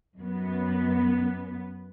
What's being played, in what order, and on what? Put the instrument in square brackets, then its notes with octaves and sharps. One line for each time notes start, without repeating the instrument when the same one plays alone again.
[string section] F#2 B3